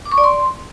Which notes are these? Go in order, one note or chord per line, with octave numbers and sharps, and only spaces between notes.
D6
C#6
D5
C6